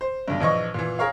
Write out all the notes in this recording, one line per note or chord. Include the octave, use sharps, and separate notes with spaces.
C5
B1 G2
A#1 E3 D#5 C#6
A#2 E3
G#4 A#4 C#5 F5